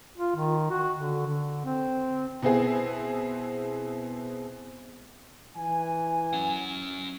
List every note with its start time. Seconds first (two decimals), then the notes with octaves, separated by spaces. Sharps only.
0.18 F4
0.36 D#3
0.71 F#4
0.97 D3
1.27 D3
1.65 C4
2.42 B2 B3 C4 E4 G#4
5.56 E3 G#5
6.33 C#4 F#5